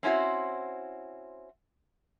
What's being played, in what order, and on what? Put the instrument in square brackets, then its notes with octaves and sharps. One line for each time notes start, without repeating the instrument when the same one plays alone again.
[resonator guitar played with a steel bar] C4 C#4 E4 F#4 C5